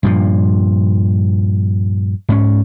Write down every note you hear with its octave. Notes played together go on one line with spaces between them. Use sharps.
G2 A#2 F3
G#2 C#4